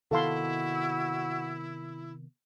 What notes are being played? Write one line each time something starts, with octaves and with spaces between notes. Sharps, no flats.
C3 D#3 B3 E4 F#4 A4 F5 C6